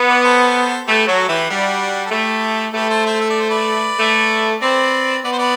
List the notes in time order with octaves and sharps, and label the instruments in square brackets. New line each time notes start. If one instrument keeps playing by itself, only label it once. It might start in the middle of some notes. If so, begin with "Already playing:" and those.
Already playing: [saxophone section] B3
[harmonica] B4 D5
A4 C5
[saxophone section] A3 [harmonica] G4 B4
[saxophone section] F#3 [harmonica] F#4 A4
[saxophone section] E3 [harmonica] E4 G4
[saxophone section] G3 [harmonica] D4 F#4
[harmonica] A4
[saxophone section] A3 [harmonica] E4 G4
[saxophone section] A3 [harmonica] G4 B4
[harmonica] A4 C5
C5 E5
E5
D5
C5
B4 D5
[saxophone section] A3
[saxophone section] C4 [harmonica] B4 D5
[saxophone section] B3 [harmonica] D5
[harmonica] C5
B4 D5